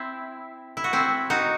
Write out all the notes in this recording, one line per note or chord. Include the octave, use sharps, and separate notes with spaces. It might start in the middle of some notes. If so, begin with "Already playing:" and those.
Already playing: C4 E4
E4
F#4
C4 E4
D#4 F#4